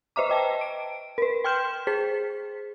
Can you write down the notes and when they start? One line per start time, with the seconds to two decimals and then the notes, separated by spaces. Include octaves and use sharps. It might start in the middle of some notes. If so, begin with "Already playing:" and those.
0.16 B4 C5 D#5 E5 A#5 D6
0.30 D#5 G5 A5
0.61 D7
1.18 A#4 B4
1.44 G5 C6 F6 G6 E7
1.87 G#4 C5 B6